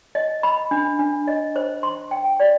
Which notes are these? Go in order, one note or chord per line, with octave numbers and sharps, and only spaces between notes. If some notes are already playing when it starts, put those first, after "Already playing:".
D#5
B5
D4
D4
D#5
C5
C6
G5
D5